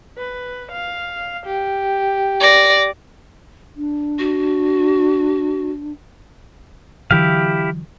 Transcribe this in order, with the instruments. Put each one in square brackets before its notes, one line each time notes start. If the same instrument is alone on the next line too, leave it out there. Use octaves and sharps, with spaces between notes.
[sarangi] B4
F5
G4
[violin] D5 A#6
[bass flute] D4
[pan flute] F#4
[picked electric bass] D3 E3 F#3 [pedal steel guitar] E4 G4 F5